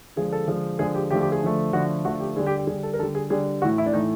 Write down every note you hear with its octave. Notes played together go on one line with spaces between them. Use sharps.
D3 F3 G#3 G#4
A4
D3 F3 G#3
D3 F3 G#3 G#4
G4
D3 F3 A3 G4
G4
G#4
D3 F3 A3
D3 F3 A3 F#4
D3 F3 A3 F#4
G4
D3 G3 G#4
G4
G4
D3 G3 G#4
A4
A#4
D3 G3 A4
G#4
D3 G3 G#4
A2 E3 A3 F#4
E4
D4
A2 E3 A3 D#4